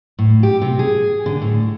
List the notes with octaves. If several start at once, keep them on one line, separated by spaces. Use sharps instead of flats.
A2
G4
C3
G#4
D3
A2